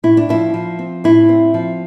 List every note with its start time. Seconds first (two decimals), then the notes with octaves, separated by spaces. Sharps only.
0.03 A2 E4
0.17 D4
0.29 F3 E4
0.54 F3
0.79 C4
1.04 A2 E4
1.29 C4
1.54 F3